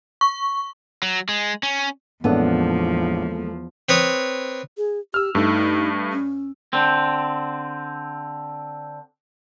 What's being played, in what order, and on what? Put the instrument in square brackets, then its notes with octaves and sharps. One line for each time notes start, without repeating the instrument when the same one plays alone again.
[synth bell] C#6
[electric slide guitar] F#3
G#3
C#4
[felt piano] A1 D4 [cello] E2 F3 [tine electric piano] G#3 A#3 A4 [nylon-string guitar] B3
[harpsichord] C4 B4 C#5 D#6
[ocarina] G#4
[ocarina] G4 [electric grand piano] E6 F6
[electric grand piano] G2 A3 [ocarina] D#4
[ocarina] C#4
[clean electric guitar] D3 C4